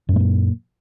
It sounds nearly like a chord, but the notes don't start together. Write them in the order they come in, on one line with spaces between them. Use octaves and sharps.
F#2 A#2 A3 A#3